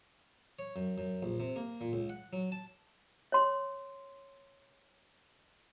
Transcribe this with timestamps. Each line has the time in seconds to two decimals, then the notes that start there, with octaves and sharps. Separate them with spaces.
0.59 C#5
0.76 F#2
0.98 F#2
1.23 A#1
1.40 C3
1.56 A#3
1.81 A#2
1.93 C#2
2.09 F#5
2.33 F#3
2.52 A5
3.32 C#5 C6